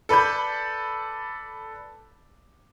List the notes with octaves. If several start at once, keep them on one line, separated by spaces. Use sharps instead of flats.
A4 B4 D5 B5 G6